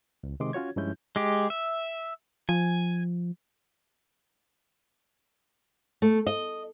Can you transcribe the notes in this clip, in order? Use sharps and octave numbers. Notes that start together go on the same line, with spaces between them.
C#2
C3 D#3 G#3 D#5 C6 D6
C#4 F4 F#4 C#5 G#6
G2 F3 G#3 C#4 E4 G6
G#3 G4
E5
F3 G#5
A3
D#5